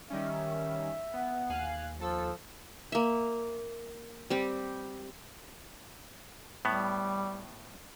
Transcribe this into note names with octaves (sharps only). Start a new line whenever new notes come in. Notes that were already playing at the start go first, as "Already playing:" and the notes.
D#3 G3 C#4 E5
B3 F#5
D#2 F5 G#5 F#6
F3 A4 E6
A#3 E5
G3 C4 G4
A2 G3 B3